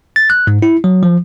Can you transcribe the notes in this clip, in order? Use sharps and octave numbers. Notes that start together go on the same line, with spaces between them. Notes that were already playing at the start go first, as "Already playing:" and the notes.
A6
F#6
G#2
E4
F#3
F3